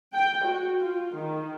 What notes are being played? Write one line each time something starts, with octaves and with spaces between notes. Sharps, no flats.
G5
F#4
F4
D#3